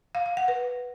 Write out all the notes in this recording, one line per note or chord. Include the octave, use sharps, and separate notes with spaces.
F5
F5
F#5
B4